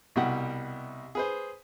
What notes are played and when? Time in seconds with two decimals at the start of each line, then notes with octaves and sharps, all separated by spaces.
0.16 C2 B2 G3 F#5
1.15 G#4 B4 C5